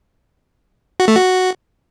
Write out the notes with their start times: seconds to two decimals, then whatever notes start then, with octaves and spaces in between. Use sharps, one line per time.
1.00 F#4
1.08 A3
1.16 F#4